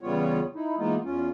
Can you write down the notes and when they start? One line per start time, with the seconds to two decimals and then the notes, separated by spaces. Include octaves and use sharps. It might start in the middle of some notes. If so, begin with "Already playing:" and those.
0.01 E2 C#3 G3 B3 F4 C#5
0.55 D#4 E4
0.78 E3 G#3 A#3 B3 D#4 F4
1.04 E2 C#4 F4